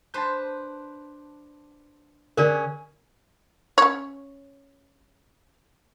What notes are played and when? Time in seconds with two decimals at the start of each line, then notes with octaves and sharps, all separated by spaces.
0.14 D4 B4 C5 A5 C6 G6
2.37 D3 C#4 G4 G#4 A#4 D5 F#6
3.78 C#4 C#5